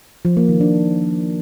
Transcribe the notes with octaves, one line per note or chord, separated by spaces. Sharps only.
F3
A#3
D#3
D4